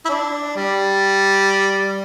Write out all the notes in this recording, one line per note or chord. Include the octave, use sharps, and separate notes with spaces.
E4
D4
G3